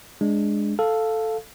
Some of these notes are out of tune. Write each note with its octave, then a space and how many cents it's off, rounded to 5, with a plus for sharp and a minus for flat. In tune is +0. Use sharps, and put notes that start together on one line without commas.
G#3 +0 D4 +0
A4 +0 F5 +0